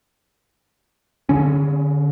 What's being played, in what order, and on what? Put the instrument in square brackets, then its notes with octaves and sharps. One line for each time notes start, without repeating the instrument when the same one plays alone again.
[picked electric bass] D3 C#4